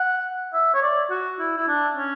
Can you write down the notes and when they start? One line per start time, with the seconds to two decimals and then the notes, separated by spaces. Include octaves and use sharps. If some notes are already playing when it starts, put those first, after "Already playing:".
Already playing: F#5
0.53 E5
0.74 C#5
0.82 D5
1.10 F#4
1.39 E4
1.57 E4
1.68 D4
1.96 C#4